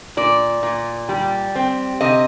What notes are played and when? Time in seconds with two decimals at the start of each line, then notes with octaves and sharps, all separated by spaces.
0.17 A#2 D5
0.63 A#2
1.09 G3
1.55 C4
2.01 C3 D#5